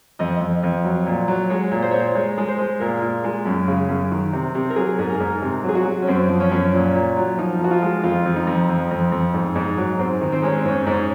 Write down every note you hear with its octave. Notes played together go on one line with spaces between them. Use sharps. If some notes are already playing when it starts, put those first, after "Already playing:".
F2 D#5
F2
F2
F#3
A#2
F#3
G#3 C#5
A#2
C5
A#2 C#5
C5
G#3 C#5
G#3
C5
G#3
A#2 A#4
A#2
G#3
F#2
C#3
F#2
D#3
C3
C3
A#4
F#3 G#4
G#2 G#4
A#4
G#2
C3
F#3
G#4
F#4
F#3
C#4
F#2 C4
F3
C#4
F#2
A#2 C#4
A#2
F#3
F3 D#4
F3
F#4
F4
G#3
F2 F4
F2
D#4
F2
F2
F2
F2
G#2
G#2
F#3
G#2 C4
D#3
C4
G#3 C#4
C4
G#2 C#4
C4
G#2
C#4